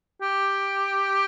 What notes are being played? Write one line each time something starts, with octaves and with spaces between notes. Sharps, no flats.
G4